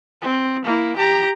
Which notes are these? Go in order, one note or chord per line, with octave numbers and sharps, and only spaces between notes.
C4
A#3 E4
G4 A#5